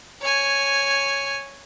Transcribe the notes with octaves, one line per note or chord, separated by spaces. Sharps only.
C#5 G#5